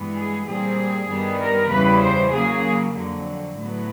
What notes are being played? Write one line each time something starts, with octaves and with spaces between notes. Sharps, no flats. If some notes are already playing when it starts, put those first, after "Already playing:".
Already playing: G2 E3 G#3 B3
G#4
A#2 G3 C4 G#4
G2 D#3 G3 B3
A#4
E2 C#3 E3 G3 B4
C5
C#3 F#3 A#3 G#4
F2 D3 F#3
A2 F#3 B3